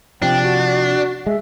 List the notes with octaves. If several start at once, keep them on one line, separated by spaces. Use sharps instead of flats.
C3 F3 D4 G5
F#4
G#3 E5